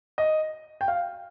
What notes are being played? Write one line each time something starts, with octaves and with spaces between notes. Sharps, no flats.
D#5
G5
F5